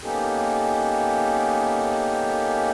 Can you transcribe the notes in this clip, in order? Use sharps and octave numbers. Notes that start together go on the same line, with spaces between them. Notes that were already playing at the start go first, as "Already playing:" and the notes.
A#3 B3 C#4 D#4 G4 A4